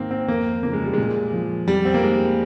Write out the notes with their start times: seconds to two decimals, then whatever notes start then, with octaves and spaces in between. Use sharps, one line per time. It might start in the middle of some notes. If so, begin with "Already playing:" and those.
Already playing: G#2 D#3 A#3 C4
0.11 C4
0.28 F2 A#3
0.63 C#3 F3 A#3
0.73 G#3
0.84 G3
0.93 A#2 G#3
1.33 F3
1.68 F2 G3
1.85 C4
1.94 A#3
2.03 D#3 G#3